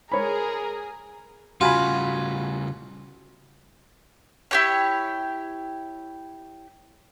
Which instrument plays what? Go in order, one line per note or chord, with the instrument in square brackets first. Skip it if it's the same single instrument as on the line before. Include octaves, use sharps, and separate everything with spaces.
[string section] G#4 [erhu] A#4 [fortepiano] C#5 B5
[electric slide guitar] C#3 G3 [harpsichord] F4 [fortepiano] F#4 G#5 B5
[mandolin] E4 G4 C#5